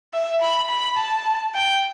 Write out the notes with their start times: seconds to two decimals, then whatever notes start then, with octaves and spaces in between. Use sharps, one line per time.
0.14 E5
0.42 B5
0.69 B5
0.98 A5
1.55 G5